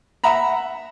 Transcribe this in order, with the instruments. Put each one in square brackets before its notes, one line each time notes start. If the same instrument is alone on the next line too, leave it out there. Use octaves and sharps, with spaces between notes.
[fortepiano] E5 F#5 A#5 B5